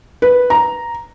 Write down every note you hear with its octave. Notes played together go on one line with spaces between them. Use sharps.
B4
A#5